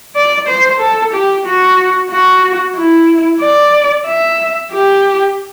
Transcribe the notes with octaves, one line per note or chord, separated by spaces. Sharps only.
D5
C5
A4
G4
F#4
F#4
E4
D5
E5
G4